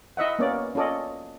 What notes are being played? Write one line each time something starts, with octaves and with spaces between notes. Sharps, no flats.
E4 D#5 E5 F#5
A#3 B3 C#4 C#5 D5
C#4 F4 A4 D5 D#5